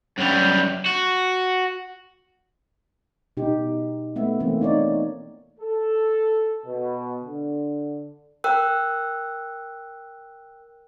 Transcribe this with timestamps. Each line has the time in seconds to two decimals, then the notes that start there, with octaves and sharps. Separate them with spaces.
0.18 F#2 G3
0.86 F#4
3.37 B2 D#4 G4
4.16 A3 B3 E5
4.39 E3 A3 A#3 C4
4.61 D#4 C#5 D5
5.60 A4
6.65 B2
7.21 D3
8.44 A#4 G5 E6 F#6